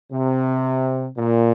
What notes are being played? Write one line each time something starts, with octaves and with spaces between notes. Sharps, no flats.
C3
A#2